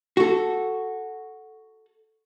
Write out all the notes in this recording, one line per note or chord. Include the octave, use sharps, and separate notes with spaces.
F#4 A4